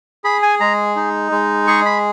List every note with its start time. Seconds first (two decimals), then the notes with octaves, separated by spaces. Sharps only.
0.24 G#4 B5
0.42 G#5
0.60 G#3 A#5
0.96 D#4
1.32 G#3
1.67 G#4 C#6
1.85 B5